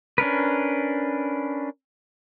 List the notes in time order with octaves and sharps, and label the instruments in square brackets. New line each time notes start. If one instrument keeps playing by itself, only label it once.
[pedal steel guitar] C#4 D4 A#4 B4